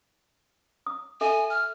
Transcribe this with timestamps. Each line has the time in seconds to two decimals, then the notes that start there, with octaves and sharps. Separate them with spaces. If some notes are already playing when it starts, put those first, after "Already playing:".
0.86 D#6
1.21 A4 E5 G#5
1.50 F6